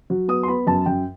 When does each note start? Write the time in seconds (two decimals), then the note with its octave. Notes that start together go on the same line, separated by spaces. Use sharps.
0.10 F#3
0.28 B3 D#6
0.43 C6
0.48 B3 B5
0.67 F#2 A5
0.86 F#2 G5